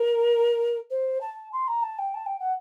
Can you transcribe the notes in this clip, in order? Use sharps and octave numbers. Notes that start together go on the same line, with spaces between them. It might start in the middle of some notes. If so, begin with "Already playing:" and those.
Already playing: A#4
C5
A5
C6
A#5
A5
G5
A5
G5
F#5